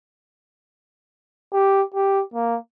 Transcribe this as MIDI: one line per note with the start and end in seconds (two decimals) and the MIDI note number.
1.53 1.82 67
1.94 2.22 67
2.34 2.57 58